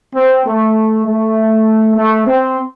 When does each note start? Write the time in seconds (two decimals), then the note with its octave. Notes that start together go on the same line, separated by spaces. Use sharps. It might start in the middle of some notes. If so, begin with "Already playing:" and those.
0.15 C4
0.45 A3
1.06 A3
1.96 A3
2.26 C4